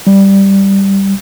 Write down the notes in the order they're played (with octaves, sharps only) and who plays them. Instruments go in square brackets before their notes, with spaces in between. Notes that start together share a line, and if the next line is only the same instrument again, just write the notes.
[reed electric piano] G3